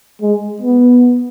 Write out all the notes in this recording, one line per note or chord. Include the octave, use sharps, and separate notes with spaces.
G#3
B3